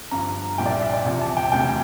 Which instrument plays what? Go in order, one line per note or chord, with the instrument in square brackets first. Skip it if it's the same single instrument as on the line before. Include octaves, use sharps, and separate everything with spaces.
[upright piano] G1 G2 F3 A#5
C2 A#2 F3 G5
D5
E5
E5
D5
E2 C3 F3
A5
G5
E1 D2 C3 G5